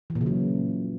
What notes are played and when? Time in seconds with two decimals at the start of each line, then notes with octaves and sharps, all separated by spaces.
0.10 E3
0.15 A#2
0.21 C#3
0.26 F#3